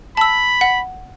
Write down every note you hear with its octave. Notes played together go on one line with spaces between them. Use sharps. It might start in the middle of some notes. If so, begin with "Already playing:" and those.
A5 B5 E6
F#5